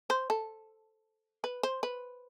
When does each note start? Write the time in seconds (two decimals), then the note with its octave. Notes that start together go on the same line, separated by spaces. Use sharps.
0.10 C5
0.30 A4
1.44 B4
1.63 C5
1.83 B4